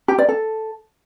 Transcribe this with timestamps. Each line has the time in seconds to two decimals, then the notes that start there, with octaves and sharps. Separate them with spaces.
0.08 G4
0.18 D5
0.29 A4